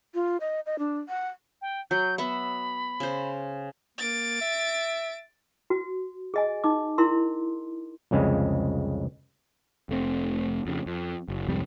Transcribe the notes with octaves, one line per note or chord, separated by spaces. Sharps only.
F4
D#5
D#5
D4
F#5
G5
F#3 G6
B3 E5 F#5 B5
C#3 C5
A#3 A6 D7
E5
F#4
G#4 D#5 G#5
D#4 D6
E4 A#4 C6
C2 F2 C#3 G#3
F1 A3 C4
F2 C#3
F2
F#1
C2 F2 G#2 G3